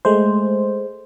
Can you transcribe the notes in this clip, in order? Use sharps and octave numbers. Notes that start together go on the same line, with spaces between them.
G#3 A3 C5